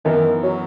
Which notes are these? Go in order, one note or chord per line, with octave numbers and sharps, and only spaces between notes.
F#2 D#3 E3 B3 E4 A#4
F#3